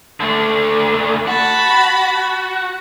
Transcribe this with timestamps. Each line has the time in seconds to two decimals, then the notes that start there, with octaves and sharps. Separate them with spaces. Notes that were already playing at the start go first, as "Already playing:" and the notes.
0.20 D3 A3
1.28 F#4 A5 B5